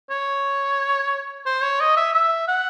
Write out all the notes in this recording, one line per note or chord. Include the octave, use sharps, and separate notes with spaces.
C#5
C5
C#5
D#5
E5
E5
F#5